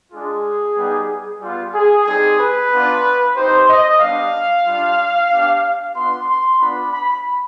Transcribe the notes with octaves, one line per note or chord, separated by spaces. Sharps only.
G#3 D4 F4 G#4
G3 B3 D#4 G4
G3 B3 F4
G#4
G3 C4 D#4 G#4
B4
B3 D4 F4
C4 D#4 G4 C5
D#5
G3 B3 D4 F5
G3 D4 F4
B3 D4 G4
B3 D4 F4 C6
C6
B3 D4 F4 B5
B5